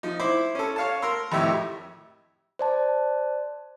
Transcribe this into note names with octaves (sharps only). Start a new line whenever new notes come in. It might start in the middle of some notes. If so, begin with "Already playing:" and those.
F3 D#4
E4 C5 B5 D6
C#4 A4
C#5 F5 A5
A#4 A#5 C6 E6
G#1 F2 A2 G4 E5 E6
C5 D5 A5